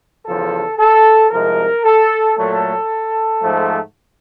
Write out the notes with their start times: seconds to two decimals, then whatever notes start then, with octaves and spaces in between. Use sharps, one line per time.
0.26 E2 C#3 F3 A4
0.79 A4
1.31 C2 C3 F3 G#3 A#4
1.84 A4
2.37 A#2 F#3 A3 A4
3.43 G#2 F3 A3